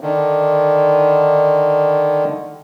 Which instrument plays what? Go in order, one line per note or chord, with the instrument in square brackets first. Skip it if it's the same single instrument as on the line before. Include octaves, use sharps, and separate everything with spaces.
[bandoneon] D3 D#3